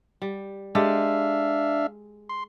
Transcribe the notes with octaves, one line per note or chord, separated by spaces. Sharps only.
G3
G#3 D4 G4 A4 E5 F5
C6